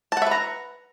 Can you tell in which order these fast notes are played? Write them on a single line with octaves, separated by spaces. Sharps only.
A5 F#5 E5 B4 A#5